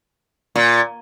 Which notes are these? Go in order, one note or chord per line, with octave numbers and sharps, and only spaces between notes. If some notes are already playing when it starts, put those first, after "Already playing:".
A#2